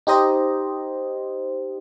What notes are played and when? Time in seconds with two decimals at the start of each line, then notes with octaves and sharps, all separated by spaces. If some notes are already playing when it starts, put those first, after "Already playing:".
0.07 D#4 G4 C5 D#5